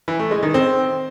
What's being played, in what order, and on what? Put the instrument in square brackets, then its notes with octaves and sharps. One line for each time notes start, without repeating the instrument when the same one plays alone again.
[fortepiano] E3
A3
G#3
D#3
C4